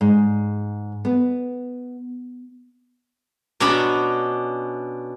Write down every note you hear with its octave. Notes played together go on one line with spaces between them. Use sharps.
G#2
B3
B2 C#4 D4 A#5 B5